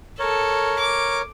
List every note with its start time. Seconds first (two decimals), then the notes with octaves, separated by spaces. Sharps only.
0.19 A4 A#4 C#5
0.79 D6